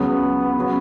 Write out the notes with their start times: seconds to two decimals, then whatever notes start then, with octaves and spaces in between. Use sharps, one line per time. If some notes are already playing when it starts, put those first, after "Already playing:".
Already playing: C#2 C#3 F#3 B3 C#4 G#4
0.58 C#3 F#3